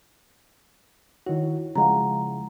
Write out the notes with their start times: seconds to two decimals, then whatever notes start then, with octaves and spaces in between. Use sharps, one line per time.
1.26 D#3 E4 F#4 C#5
1.76 C#3 F3 G#3 F5 F#5 A#5